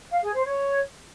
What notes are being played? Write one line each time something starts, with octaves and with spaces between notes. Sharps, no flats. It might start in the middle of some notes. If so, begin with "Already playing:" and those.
F5
G#4
C5
C#5